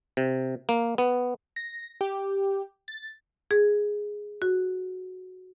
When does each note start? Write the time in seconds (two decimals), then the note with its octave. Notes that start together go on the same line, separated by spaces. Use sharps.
0.17 C3
0.69 A#3
0.98 B3
1.56 A#6
2.01 G4
2.88 A6
3.51 G#4
4.42 F#4